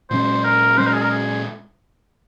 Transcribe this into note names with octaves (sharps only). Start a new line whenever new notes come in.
A#2 G#3 C#4 C5
A#4
A#2 G#3 C#4 C5
A#4
G#4
A#4
G#4